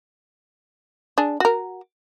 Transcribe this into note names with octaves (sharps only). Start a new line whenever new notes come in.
D4 G#4
F#4 A#4